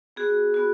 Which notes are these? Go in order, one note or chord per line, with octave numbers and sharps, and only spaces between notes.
B3 F#4 G#4
B3 F#4